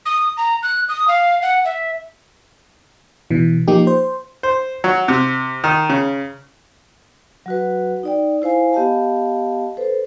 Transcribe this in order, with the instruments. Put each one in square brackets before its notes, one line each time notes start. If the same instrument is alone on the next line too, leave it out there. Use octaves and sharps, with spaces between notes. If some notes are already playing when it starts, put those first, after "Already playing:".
[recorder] D#6
A#5
F#6
D#6
F5
F#5
E5
[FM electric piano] B2 E3
F3 A#3 D#4 G4
C5
[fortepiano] C5
F#3
C3
D#3
C#3
[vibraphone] F#3 F#4 B4
D#4 D5 G5
E4 C5 F5 G#5
B3 G4 D#5 F5 A5
A4 B4 C5